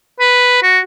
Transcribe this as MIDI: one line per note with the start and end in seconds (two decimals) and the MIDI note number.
0.20 0.62 71
0.63 0.79 66